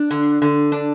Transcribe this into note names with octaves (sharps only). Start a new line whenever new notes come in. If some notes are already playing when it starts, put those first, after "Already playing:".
Already playing: D4
D3
D3
D4